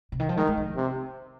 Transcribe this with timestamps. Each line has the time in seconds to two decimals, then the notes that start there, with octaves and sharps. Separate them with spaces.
0.12 C3
0.20 D#3
0.29 F3
0.37 D#3 G#3
0.47 G#3
0.57 F3
0.76 C3